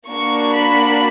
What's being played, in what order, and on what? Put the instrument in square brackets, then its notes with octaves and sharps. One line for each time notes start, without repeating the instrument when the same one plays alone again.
[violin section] A#3 D4 F#4 C#6
B5